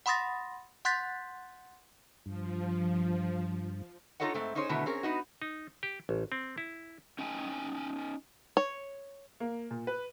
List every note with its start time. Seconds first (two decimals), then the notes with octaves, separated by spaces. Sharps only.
0.06 F#5 B5 C6 D#6 A6 A#6
0.85 F#5 C6 F#6 G6 A6 B6
2.26 G2 F3
4.20 D#4 F4 A4 C#5 D#5 F#5
4.34 G#2 A3 C4
4.55 C#4 D#4 G#4 C5 C#5
4.69 B2 D3 D#3 A3 B3 E4
4.86 C4 C#4 G#4 A#4
5.03 B3 D#4 F#4
5.42 D#4
5.83 G4
6.09 A1
6.32 C4
6.58 E4
7.19 C#4 D#4 G5 G#5
8.57 C#5
9.40 A#3
9.71 A#2
9.87 B4